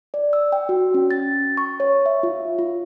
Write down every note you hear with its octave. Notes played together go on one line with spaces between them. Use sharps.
D5
E6
G5
F#4
C#4
A6
C#6
C#5
E5
F4
F4